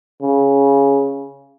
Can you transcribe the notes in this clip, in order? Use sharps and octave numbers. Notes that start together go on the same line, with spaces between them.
C#3